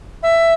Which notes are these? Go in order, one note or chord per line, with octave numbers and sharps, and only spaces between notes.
E5